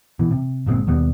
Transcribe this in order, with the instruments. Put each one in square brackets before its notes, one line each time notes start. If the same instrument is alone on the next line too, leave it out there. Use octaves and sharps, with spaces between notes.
[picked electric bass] B2 E3
C3
G1 A#2 G#3 C4
D#2 B2 G3 B3